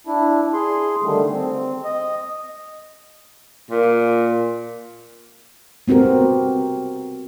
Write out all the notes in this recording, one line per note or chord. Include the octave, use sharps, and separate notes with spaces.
D4 E4
G#4 C6
D3 D#3 G3 A3
C4
D#5
A#2
B3 C4 F#4 G4 A#4